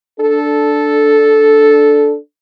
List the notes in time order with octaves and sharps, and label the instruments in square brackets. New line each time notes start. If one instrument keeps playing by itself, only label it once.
[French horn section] D4 A4